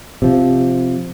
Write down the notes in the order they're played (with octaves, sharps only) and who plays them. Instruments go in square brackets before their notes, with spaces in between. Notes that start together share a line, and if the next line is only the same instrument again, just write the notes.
[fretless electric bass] C3 F3